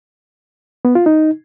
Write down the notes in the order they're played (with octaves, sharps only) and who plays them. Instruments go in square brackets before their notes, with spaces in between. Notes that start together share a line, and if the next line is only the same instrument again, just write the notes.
[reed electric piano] B3
F4
D#4